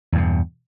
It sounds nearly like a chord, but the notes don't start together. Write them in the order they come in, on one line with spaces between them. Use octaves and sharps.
E2 G2 B2